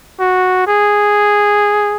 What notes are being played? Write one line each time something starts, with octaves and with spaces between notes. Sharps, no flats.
F#4
G#4